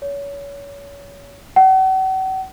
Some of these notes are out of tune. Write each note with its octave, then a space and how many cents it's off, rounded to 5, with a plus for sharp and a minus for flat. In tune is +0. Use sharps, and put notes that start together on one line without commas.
C#5 +30
F#5 +40